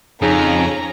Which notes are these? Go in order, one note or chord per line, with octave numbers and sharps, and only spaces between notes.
F2 C#3 C#4 D#4 A#5